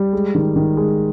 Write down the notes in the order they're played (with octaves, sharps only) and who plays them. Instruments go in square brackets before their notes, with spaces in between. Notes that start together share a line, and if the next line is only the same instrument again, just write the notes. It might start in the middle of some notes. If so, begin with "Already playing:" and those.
Already playing: [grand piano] G3
G#3
D#3
D#3
G#3